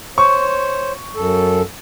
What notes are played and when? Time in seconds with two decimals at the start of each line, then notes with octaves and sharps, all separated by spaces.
0.18 C5 C#5 C#6
1.16 F#2 A4